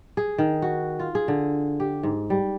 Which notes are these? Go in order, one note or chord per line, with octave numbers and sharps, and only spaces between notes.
G#4
D#3
F#4
F4
G#4
D3
G4
G#2
G3